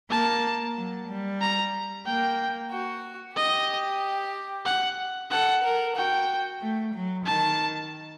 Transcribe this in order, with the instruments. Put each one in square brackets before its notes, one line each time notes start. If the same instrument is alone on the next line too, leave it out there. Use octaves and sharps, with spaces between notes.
[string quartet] A#3 [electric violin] A5
[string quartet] F#3
G3
[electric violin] A#5
[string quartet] A#3 [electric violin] G5
[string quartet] F#4
[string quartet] G4 [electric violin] D#5
[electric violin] F#5
[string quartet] A4 [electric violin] F#5
[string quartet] A#4
[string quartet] F#4 [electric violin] G5
[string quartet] A3
F#3
[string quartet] D#3 [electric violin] A5